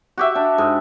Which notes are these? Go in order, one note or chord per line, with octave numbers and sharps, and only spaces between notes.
F#4 G4 E5
D4
G#2